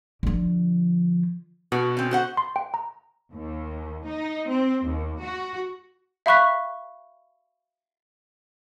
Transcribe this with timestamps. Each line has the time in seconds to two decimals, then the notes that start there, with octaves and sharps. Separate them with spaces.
0.23 D3 F3
1.72 B2 F#4
1.97 C4 C#4
2.11 F#4 C5 F#5
2.37 C6
2.56 G5
2.74 A#5
3.33 D#2
4.07 D#4
4.49 C4
4.85 D#2
5.21 F#4
6.26 E5 F5 B5 C#6 F#6 B6